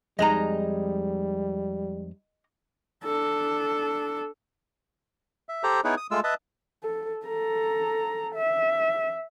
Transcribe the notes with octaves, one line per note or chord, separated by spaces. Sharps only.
F2 G3 G#3 D#4 D#5 A#5
D4 A4
E5
G4 A4 C5 A#5
B3 D#4 E4 G#4 B4 C#5
D#6
G#3 A3 F4 E6
B4 D#5 E5 A5
A4
A4 A#5
E5